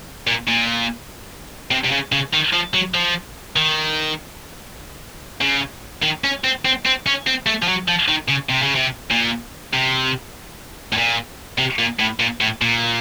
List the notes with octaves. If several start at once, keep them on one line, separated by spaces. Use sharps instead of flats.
A#2
A#2
C3
C3
C#3
C#3
D#3
F3
F#3
F3
D#3
C#3
D#3
C#4
C4
C4
C4
C#4
C4
A3
F3
F#3
F3
D#3
C#3
C3
C#3
C3
A#2
C3
A2
A#2
C3
A#2
A2
A#2
A2
A#2